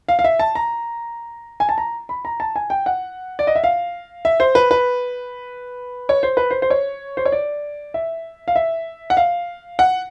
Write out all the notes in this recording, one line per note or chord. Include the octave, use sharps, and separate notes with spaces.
F5
F5
E5
A5
A#5
G#5
A5
A#5
B5
A#5
A5
G#5
G5
F#5
D5
D#5
E5
F5
E5
C5
B4
B4
C#5
C5
B4
C5
C5
C#5
C5
C#5
D5
E5
F5
E5
F#5
F5
F#5